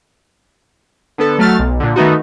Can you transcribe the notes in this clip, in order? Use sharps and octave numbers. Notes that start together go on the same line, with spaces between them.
D3 B3 A4
F#3 A3 F6 A6
B1
A#2 D3
D#3 A3 B3 D#4 F#4